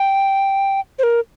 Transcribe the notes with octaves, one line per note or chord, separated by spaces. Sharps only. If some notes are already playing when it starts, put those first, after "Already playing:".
Already playing: G5
C5
A#4